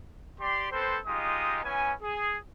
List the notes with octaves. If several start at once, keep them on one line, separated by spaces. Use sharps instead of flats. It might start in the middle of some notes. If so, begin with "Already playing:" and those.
G4 D5 C6
C4 A4 B4 C5
G#3 D#4 F4 G4 D#5 D#6
B3 C#4 E4 G#5
G#4